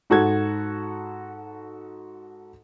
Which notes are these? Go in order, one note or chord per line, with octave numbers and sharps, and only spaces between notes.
G#2 F#4 A4 G#6